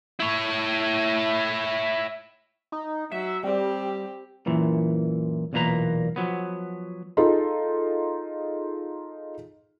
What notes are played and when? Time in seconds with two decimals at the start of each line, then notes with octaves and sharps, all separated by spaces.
0.20 E4 C#5
2.72 D#4
3.11 F#3 E5
3.43 G3 C4 G4
4.46 F#2 A#2 E3
5.53 B1 E2 A#2 A#3 B4 A#5
6.16 F3 F#3 B3
7.17 D#4 F4 G#4 A4